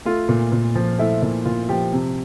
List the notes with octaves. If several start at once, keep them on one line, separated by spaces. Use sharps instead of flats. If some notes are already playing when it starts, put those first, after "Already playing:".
A3 F4
A#2
A#2
F3
A3 E4
A#2 E4
A#2 F4
F3 G4
C3